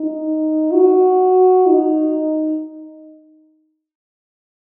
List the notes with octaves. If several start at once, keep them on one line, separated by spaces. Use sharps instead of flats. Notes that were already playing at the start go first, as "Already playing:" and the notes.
Already playing: D#4
F#4
D#4